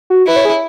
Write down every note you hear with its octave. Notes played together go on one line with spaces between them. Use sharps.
F#4
E4 B4
C#5
G#4